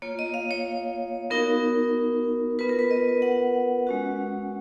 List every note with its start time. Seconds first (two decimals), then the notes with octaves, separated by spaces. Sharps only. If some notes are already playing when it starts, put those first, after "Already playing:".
0.02 A#3 F4 C#5
0.19 D#5
0.34 F5
0.51 C#5
1.30 B3 D#4 F#4 A#4
2.59 B3 F4 B4
2.69 A#4
2.79 B4
2.91 D#5
3.22 F#5
3.87 G#3 C#4 F#4